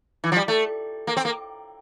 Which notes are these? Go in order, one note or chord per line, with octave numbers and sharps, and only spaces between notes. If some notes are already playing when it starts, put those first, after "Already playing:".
E3
F3
G3
A3
A#3
C4
A#3